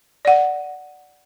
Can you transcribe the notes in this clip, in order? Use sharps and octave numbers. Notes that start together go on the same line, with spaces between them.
D5 F#5